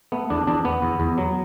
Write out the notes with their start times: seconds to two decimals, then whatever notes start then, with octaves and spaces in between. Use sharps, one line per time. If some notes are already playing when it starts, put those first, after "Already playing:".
0.12 A3 B3
0.30 E2 D4
0.47 E2 D4
0.65 B3
0.82 E2
1.00 E2
1.18 F#3